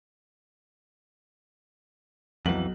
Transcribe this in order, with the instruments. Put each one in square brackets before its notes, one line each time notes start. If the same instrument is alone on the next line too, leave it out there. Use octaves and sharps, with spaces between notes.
[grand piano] B1 F#7 [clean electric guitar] F2 E3